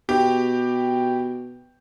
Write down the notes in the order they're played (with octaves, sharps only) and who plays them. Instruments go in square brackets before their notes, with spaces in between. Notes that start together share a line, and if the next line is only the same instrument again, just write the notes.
[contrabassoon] B2 [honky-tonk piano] G4